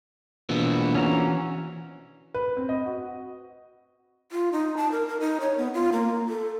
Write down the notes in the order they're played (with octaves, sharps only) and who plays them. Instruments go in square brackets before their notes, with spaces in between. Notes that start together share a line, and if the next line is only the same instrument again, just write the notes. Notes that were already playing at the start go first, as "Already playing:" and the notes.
[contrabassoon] A#1 [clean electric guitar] B2 E3 B3
[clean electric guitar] E3 [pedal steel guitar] C#4 F#4 A#5
[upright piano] B4
C4
D#5
F#4
[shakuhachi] F4
D#4
A5
A#4
A#4
D#4
C#5
B3
F4
A#3
A4